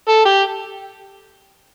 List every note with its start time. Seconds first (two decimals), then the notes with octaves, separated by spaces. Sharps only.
0.09 A4
0.25 G4